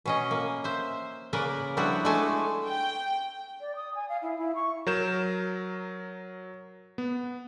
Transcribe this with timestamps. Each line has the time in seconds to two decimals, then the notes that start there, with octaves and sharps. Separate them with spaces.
0.06 B2 C#4 D#5
0.31 A#3
0.64 C5 E5
1.33 C#3 A#3 A#4 B4 D5
1.77 F3 G3 B3 D4 E4 F#4
2.05 G#3 A3 D4 F#4 G#5 A5
2.67 G5
3.61 D5
3.76 D#6
3.95 G#5
4.09 F5
4.22 E4
4.38 E4
4.55 C#6
4.87 F#3 A#4 G6 E7
6.98 B3